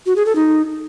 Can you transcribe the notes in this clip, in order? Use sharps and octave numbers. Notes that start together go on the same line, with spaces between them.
F#4
G#4
A4
D#4